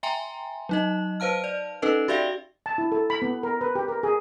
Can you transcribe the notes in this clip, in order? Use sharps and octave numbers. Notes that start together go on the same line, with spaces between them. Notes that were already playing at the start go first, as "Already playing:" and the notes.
E5 G5 G#5 A#5 C6
F#3 D#4 D#5
B4 C5 F5 A5 F6
D5
C#4 D#4 A4 B4 D#5
F#4 G4 D5 E5 F5 G5
A5
E4
A4
B5
B3
A#4
B4
G4
A#4
G#4